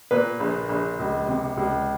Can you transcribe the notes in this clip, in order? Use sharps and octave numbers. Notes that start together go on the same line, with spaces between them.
A#2 B4
A#1
A#1
C#2
C3
C#2